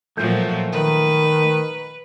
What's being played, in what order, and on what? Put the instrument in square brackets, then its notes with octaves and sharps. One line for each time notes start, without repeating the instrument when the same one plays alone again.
[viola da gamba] A#2 F3 F#3 [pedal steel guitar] A3 G6
[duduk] D#3 [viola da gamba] B4